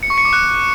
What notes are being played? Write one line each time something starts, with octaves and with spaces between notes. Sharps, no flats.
C#7
C#6
C#7
D6
F#6